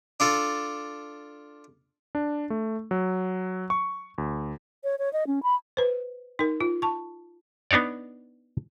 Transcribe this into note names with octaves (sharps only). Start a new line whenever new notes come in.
D4 F4 A4
D4
A3
F#3
C#6
D2
C#5
C#5
D#5
C#4
B5
B4 C5
D#4 A#4
F4
A5 C#6
B3 D4 D#4 C#5 D5